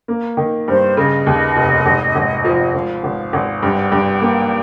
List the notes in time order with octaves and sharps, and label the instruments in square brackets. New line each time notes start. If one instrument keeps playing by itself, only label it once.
[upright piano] A#3
D#3
[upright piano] G2 [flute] C5
[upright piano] C#3 [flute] D#5
[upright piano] D#2
F1
G#1
G#1
F3
[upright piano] G#1 [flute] F5
[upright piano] G#1
G#1
[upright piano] G2 [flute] G5
[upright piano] G2
A#3